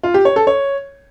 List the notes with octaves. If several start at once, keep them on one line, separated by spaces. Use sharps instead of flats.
F4
G4
C#5
A4
C#5